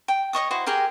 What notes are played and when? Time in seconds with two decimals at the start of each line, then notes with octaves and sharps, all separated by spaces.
0.08 G5
0.33 C#5 D#5 C#6 D#6
0.51 E4 F#4 C5
0.66 G4 G#4 A#4 G5